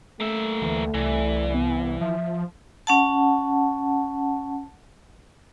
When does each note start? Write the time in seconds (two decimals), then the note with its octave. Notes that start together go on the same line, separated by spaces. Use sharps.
0.20 A3 A#3 E5
0.62 D2 E3
0.94 C2 E3 D5
1.54 B3
2.01 F3 E5
2.87 C#4 F#5 A5